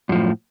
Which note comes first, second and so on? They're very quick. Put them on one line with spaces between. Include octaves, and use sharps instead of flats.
F#2 F3 A2